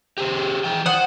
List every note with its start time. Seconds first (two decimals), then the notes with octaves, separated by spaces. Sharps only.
0.18 G4 G#4 C5
0.64 E3 G5
0.86 C5 F#5 D#6